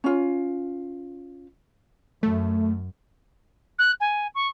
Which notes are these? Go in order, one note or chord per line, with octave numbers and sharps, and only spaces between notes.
C#4 F4
F#2 A3
F#6
G#5
C#6